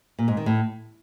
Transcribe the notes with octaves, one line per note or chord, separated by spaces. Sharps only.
A#2
G#2
D#3
A2